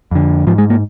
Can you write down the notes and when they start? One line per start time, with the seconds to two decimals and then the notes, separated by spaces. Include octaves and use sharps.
0.11 F2 D3
0.47 G#2 F3
0.58 G#3
0.70 A#3